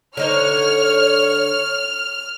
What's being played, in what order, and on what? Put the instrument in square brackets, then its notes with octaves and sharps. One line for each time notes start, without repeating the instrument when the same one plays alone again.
[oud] D3 D#4 C5 [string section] C#5 [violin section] F6